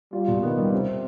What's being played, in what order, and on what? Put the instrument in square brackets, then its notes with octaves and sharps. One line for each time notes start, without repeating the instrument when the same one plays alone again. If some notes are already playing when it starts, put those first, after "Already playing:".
[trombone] G3 [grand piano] F4
[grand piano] B2
[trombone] D#3 [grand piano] B3
[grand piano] G3
[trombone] C3 [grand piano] C4